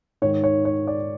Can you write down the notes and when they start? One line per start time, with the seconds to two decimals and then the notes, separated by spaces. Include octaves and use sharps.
0.22 G#2 D#3 C#5
0.44 C#5
0.65 C#5
0.87 D5